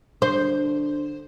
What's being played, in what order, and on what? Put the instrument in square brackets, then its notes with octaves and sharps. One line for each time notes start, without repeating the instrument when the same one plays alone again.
[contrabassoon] D3 [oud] C5